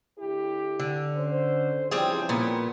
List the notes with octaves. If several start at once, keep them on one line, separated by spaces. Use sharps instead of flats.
D2 E4 G4
D3
C#4 C5
C#3 E3 F3 G3 C4 G#4
A#2 B3